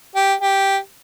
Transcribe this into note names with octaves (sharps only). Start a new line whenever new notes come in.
G4
G4